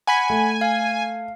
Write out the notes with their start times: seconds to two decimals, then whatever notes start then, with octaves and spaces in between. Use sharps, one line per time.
0.07 F#5 G#5 B5 B6
0.30 A3
0.61 F5